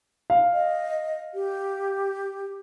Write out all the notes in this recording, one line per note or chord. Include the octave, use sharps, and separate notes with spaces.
F5
D#5
G4